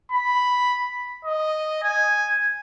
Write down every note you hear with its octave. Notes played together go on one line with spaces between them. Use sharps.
B5
D#5
G#5